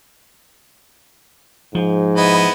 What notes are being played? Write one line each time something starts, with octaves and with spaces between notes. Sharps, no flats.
G#2 F3
B3 E4 D#5